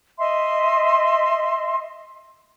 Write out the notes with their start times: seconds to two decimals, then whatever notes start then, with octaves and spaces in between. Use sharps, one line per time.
0.18 D#5 E5 C6